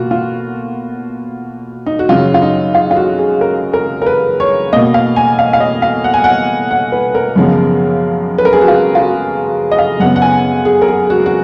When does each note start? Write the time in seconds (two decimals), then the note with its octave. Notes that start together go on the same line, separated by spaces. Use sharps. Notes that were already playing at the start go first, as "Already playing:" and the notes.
Already playing: B2 A#3 F4 F#4
0.11 F4
1.86 D#4
1.99 F#4
2.09 F#2 C#3 F#3 F4
2.34 F4
2.42 D#4
2.74 F4
2.91 F4
2.96 F#4
3.19 G#4
3.41 A#4
3.73 A#4
4.02 A#4
4.06 B4
4.40 C#5
4.73 B2 A#3 D#5
4.94 F5
5.16 G#5
5.39 F5
5.53 F5
5.60 D#5
5.82 F5
6.04 F#5
6.14 G#5
6.24 F#5
6.71 F#5
6.92 B4
7.15 A#4
7.36 F#2 C#3 F3 G#3 B3
8.38 B4
8.45 A#4
8.53 G#4
8.61 F#4
8.68 F4
8.95 F4
9.01 F#4
9.71 D#5
9.79 F5
10.00 F#2 C#3 G#3 B3 F#5
10.16 F#5
10.22 G#5
10.65 G#4
10.82 A#4
10.88 G#4
11.10 F#4
11.26 F#4